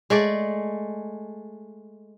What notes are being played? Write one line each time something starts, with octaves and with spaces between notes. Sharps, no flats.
G#3 A3 D5